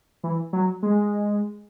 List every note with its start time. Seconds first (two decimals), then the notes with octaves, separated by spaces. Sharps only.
0.24 E3
0.53 F#3
0.83 G#3